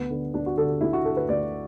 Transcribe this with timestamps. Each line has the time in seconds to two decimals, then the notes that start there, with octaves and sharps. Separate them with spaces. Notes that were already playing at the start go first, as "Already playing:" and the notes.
Already playing: D2 B3
0.10 D3
0.34 D2 D4
0.46 F#4
0.57 D3 A4
0.81 D2 E4
0.93 F#4
1.05 D3 A4
1.17 B4
1.29 D2 D5